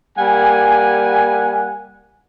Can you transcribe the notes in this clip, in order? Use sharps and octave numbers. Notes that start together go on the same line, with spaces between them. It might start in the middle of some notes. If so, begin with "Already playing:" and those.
G3 A#3 F#5 G#5